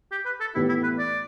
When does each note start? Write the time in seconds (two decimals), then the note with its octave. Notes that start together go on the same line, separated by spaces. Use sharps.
0.12 G4
0.26 B4
0.41 A4
0.55 A2 E3 B3 E4 G4
0.69 E4
0.83 B4
0.99 D5